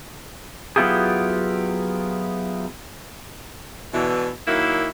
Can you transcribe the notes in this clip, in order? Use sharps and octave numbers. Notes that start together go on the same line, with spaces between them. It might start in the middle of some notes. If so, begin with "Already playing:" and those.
F#3 B3 E4 F4 G4 G#4
B2 D3 E3
D#3 F#3 A#3 E4